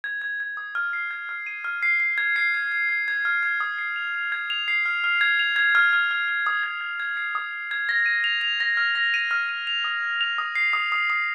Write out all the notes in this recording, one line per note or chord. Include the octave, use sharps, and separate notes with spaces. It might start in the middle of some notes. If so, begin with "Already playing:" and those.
G#6
G#6
G#6
D#6
F6
C7
G#6
F6
D#7
F6
C7
C7
G#6
C7
G#6
G#6
G#6
G#6
F6
G#6
D#6
C7
F7
F7
G#6
F7
C7
F6
F6
G#6
F7
G#6
F6
F6
F6
F6
D#6
G#6
G#6
G#6
C7
D#6
G#6
G#6
A#6
D#7
F7
F7
A#6
F6
A#6
D#7
F6
D#7
F7
D#6
G#6
F7
D#6
C7
D#6
D#6
D#6